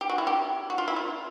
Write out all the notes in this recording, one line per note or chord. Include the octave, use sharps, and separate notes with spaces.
G4
F#4
E4
G4
F#4
F4
E4
F4